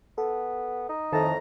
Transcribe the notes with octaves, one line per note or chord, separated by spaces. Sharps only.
B3 A4
D#4
F2 A2 D#3 A5 A#5